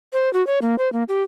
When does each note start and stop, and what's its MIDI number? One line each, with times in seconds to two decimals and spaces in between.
0.13 0.31 72
0.33 0.45 66
0.47 0.59 73
0.62 0.75 58
0.78 0.91 72
0.93 1.03 58
1.09 1.23 67